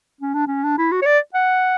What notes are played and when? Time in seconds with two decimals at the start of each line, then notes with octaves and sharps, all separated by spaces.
0.21 C#4
0.34 D4
0.47 C#4
0.64 D4
0.78 E4
0.92 F#4
1.02 C#5
1.06 D5
1.34 F#5